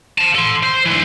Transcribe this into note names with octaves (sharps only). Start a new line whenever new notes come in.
F5 A5
A4 C6
C5
D3 E3